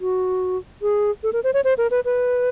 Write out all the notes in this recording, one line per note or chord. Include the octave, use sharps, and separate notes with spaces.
F#4
G#4
A4
A#4
C5
C#5
C5
A#4
B4
B4